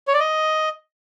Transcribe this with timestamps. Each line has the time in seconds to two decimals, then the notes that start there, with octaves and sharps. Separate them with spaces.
0.08 C#5
0.14 D5
0.20 D#5